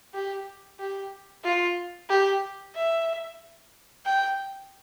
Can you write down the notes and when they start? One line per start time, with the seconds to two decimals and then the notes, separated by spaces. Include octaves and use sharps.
0.14 G4
0.80 G4
1.44 F4
2.09 G4
2.75 E5
4.06 G5